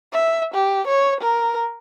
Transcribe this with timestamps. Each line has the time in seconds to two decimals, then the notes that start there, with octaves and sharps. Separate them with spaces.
0.12 E5
0.54 G4
0.87 C#5
1.20 A#4